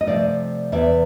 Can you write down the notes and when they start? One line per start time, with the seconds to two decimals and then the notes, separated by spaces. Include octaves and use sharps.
0.01 D#5
0.06 C3 F3 A3 C5 D5
0.72 E2 C3 E3 D5 E5